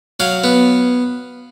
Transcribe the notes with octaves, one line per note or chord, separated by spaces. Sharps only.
F#3 F5
B3